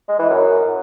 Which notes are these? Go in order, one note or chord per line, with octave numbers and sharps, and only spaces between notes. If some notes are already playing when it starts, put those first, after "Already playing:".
G#3
E3
F#2